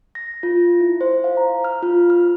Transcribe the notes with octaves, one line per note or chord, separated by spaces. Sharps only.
A#6
F4
E4
C5
F5
A#5
F6
F4
F6